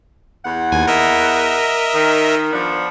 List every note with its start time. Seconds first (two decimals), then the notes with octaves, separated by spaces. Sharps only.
0.44 E2 F#5
0.72 D#2 G#5
0.88 A#4 D#5 E5
1.94 D#3
2.51 F3 B3 D4